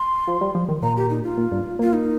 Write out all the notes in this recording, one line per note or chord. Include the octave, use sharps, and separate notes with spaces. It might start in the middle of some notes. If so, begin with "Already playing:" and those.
Already playing: C6
F3
G3
F3
D#3
A#2 A#5
G4
D#4
F4
A#2
G2
A#3 F4
D#4